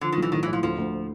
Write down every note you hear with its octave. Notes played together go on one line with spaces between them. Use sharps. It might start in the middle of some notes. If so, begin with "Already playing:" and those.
D3 F3
D#3
B1
E3
A2 D#3
E3
A2
F3
D2 F3
D2